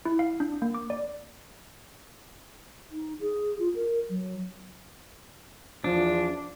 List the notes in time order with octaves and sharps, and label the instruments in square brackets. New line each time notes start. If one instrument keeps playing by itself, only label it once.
[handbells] E4
F5
D4
A#3
D6
D5
[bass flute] D#4
G#4
F4
A#4
F#3
[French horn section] E2 F3 [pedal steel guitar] D4